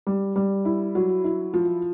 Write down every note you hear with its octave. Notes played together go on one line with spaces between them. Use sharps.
G3
G3
E4
F#3
E4
F3